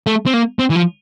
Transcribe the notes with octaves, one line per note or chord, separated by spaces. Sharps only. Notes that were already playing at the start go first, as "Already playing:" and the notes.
A3
C4
A#3
C4
E3
F3